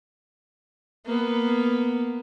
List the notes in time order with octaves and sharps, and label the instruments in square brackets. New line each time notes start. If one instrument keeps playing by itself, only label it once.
[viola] A#3 B3